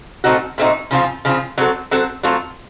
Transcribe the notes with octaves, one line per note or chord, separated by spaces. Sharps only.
A#2 A3 C4 D#4 F#4
A#2 A3 C4 D#4 F#4
C#3 F3 C4 F4
C#3 F3 C4 F4
F#3 C4 F#4 A4
F#3 C4 F#4 A4
F#3 A3 C4 F4